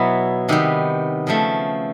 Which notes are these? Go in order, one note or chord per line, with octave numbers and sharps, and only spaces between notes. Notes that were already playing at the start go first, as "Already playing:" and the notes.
Already playing: B2 F#3 B3 E4
C3 D#3 G3 B3
C#3 F3 A3